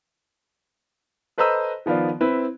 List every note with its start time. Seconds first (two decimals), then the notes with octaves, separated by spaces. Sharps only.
1.38 A4 B4 C5 D#5 A#5 E6
1.86 D#3 F3 B3 F4 D5
2.21 C4 E4 B4